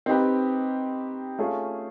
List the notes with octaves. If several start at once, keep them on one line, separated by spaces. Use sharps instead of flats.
C4 D#4 G4 B4
A3 C#4 F4 G#4